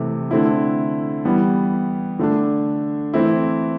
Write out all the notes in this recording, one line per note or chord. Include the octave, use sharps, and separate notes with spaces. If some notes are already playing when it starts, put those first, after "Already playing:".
Already playing: C3 E3 A3
D3 A3 C4 E4
E3 G3 B3
D3 A3 D4
E3 A3 C4 E4